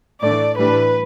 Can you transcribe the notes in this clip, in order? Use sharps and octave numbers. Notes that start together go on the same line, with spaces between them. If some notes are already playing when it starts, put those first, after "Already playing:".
A2 E3 A3 D4 D5
A2 E3 G3 D4 B4